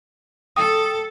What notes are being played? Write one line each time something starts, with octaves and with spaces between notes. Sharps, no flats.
A4 G5 D#6